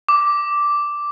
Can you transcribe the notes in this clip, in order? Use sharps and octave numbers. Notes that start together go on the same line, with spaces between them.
D6